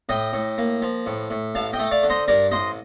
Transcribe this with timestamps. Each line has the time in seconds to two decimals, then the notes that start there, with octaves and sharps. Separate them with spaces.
0.09 A2 D#5 G5
0.33 A2
0.58 A#3
0.82 F3
1.06 A2
1.30 A2
1.55 A1 F5 A5
1.73 D#5 G5
1.79 A3
1.91 D5 F5
2.03 D3
2.10 C5 D#5
2.28 G2 A#4 D5
2.51 A1 C5 D#5